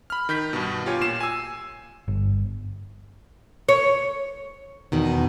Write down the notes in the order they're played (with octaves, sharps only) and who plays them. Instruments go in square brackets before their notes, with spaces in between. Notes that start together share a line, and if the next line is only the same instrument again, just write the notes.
[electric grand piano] B5 F6
D#3 G6 B6
G2 B2
F4 G4 C#5 G#5
A#2 C7 E7
G#5 E6
[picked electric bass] G1
[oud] C#5
[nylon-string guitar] E2 B2 D#3